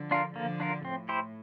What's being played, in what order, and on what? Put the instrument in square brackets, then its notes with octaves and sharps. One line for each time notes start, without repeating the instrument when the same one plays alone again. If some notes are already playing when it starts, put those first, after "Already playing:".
Already playing: [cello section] D3 F3
[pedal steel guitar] D4 F4 A#4
[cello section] D3 F3 [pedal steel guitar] A#3
[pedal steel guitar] D4 F4 A#4
[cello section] A2 [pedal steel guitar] C4
[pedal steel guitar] E4 G4 C5